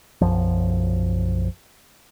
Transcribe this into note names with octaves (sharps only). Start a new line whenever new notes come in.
B1 F#2 F3